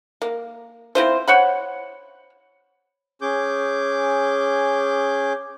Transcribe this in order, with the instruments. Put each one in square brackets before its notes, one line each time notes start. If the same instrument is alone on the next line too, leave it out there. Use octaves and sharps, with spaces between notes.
[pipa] A#3
C4 E4 F4 C5
C5 C#5 F#5 B5
[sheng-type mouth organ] C#4 G#4 D6 G6